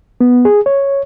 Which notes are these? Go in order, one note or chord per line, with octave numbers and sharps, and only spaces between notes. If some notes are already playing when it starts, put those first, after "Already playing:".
B3
G#4
C#5